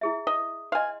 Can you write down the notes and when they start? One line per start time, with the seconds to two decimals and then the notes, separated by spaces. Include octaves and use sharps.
0.01 E4 G#4 E5
0.27 D#5
0.72 D#5 F5 G#5 C6